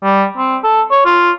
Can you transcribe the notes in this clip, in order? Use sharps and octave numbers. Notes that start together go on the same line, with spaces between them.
G3
C4
A4
C#5
F4